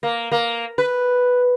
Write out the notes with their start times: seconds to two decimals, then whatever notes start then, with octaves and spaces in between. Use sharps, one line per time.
0.03 A#3
0.31 A#3
0.78 B4